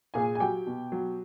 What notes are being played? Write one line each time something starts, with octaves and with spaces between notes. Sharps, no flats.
A#2 G#4 G#5
G#5
F#3 G4 G5
B2
F#3